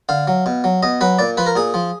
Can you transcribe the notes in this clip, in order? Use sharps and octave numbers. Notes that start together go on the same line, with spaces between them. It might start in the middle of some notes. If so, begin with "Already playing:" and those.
D3 F5
F#3
B2
F#3
B2 D#5
F#3 B4
A#2 D5
F3 B4
A#4
A#2 G#4
F3